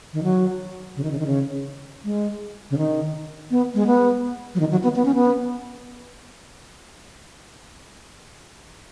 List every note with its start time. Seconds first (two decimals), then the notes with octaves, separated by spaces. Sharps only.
0.13 D#3
0.23 F#3
0.96 C#3
1.03 D#3
1.12 C#3
1.19 D#3
1.26 C#3
2.05 G#3
2.70 C#3
2.78 D#3
3.51 B3
3.75 G#3
3.87 B3
4.55 F#3
4.60 D#3
4.71 F#3
4.83 B3
4.96 B3
5.05 C#4
5.15 B3